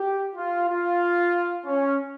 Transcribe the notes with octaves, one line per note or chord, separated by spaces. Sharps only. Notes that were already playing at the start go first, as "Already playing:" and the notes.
Already playing: G4
F4
F4
C#4